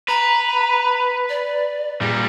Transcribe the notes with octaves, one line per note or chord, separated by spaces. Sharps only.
B4 A#5
D5
A#2 G3 G#4